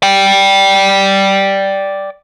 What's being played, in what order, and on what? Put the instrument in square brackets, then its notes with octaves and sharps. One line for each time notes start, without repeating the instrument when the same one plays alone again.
[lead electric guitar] D5 G5